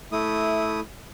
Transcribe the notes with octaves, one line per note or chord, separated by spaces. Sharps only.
A3 E4 D#6